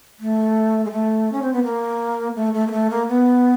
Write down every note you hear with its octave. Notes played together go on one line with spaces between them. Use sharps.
A3
G#3
A3
C#4
C4
B3
A#3
A3
A3
A#3
A3
A#3
B3